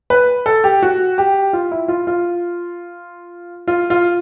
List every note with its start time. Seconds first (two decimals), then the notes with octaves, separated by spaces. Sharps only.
0.10 B4
0.46 A4
0.64 G4
0.83 F#4
1.18 G4
1.53 F4
1.71 E4
1.88 F4
2.07 F4
3.68 F4
3.90 F4